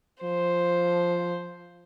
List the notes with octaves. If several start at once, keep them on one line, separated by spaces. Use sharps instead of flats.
F3 C5